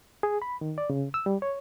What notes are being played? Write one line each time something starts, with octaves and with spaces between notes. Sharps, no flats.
G#4
B5
D#3
D5
C#3
E6
G3
C#5